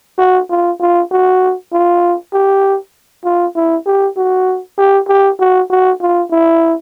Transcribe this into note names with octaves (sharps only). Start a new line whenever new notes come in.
F#4
F4
F4
F#4
F4
G4
F4
E4
G4
F#4
G4
G4
F#4
F#4
F4
E4